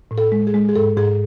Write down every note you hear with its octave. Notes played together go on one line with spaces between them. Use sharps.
A2
A4
G#3
G#4
G#3
G#4
G#2 A4
G#2 G#4